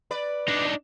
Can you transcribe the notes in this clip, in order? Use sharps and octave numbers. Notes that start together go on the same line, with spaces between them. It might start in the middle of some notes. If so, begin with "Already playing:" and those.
B4 D5
D4 D#4